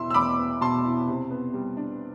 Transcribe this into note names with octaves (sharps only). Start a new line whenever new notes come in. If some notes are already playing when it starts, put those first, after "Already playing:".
Already playing: E2 B2 B3 E4 C6 E6
E6
E2 B5 D6
B3
B2 A5 C6
E4
C3
B3
G3
D4